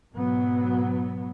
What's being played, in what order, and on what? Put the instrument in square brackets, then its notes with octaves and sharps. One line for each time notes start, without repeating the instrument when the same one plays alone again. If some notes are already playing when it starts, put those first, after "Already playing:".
[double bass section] G#2 B2 F#3 B3